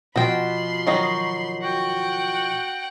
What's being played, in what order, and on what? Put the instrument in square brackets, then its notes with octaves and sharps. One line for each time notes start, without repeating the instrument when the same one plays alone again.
[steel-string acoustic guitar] B2 F3 [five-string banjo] F#4 G5 [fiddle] B5 C6
[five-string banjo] D#3 F#3 D#4 [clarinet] C#6
[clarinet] F#4 [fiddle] F#5 G5